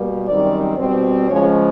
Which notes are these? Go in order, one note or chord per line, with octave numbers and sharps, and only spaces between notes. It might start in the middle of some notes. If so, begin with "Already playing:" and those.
Already playing: B2 G3 A#3
F#2 D#3 G3 C4 D5
B2 G3 C4
C#3 F3 G#3 C#4 C#5